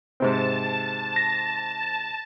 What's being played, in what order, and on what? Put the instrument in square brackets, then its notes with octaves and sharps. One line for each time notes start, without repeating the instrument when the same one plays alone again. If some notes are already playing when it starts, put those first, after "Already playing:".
[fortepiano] G#2 C3 C4 [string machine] A5
[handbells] A#6